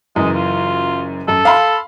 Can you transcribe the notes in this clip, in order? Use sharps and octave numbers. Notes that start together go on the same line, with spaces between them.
F#1 F#2 E3 G#3
F4
F#2 A4
F5 B5 C6